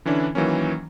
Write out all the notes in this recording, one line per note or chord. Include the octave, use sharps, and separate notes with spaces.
D3 E3 C#4 D4 E4
D#3 E3 F#3 A#3 C#4